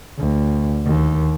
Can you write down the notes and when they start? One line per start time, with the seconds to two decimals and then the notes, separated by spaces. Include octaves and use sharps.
0.18 D2
0.85 D#2